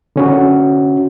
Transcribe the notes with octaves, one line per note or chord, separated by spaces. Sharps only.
D3 C#4 F#4